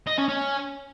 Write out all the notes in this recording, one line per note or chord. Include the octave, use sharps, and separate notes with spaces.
D#5
C#4
C#4